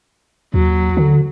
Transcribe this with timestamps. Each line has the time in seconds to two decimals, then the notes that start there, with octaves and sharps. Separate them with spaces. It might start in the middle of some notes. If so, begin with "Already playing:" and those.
0.54 D#2 F#3
0.97 D3